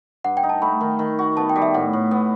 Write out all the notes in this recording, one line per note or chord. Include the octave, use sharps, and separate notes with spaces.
G2 F#5
G5
D#4
A5
A3 B5
D#3
D#3
F#4
B3 A5
G5
G3
E5
A2 F#5
A2
B3